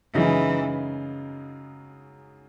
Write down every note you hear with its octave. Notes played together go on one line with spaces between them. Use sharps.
F#2 C#3 E3 G#3 D#4